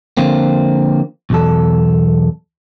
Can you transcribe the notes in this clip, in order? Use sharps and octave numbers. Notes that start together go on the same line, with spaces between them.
D3 F3 A#3 C4
B1 E2 A4